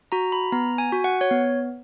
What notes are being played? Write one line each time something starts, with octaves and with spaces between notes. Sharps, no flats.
F#4 A#5
B5
B3 A#5
G#5
F#4
F#5
C#5
B3